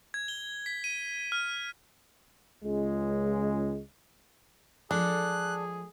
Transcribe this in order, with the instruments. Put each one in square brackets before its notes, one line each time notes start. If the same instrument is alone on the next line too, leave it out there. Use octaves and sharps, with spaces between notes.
[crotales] G#6
G7
B6
D#7
F6
[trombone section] C#2 G#3
[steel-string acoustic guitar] F3 G#3 A4 [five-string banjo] D4 [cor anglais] G#4 [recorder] F#6